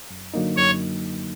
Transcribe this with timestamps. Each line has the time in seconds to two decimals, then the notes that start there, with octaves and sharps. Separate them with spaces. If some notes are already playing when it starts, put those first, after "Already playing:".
0.10 F#2
0.34 D3 F#3 A#3 D#4
0.57 F#2 C#5